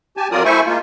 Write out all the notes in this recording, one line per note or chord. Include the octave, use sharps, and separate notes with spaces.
G4 G#5 A5
F2 F#3 F4 A#4 D5 D#6
A3 E4 C5 E5 G#5 C#6
G#3 A#3 F4